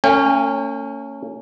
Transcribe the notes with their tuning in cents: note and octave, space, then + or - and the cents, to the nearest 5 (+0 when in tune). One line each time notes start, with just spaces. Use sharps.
A3 +45 C#4 +0 G5 +45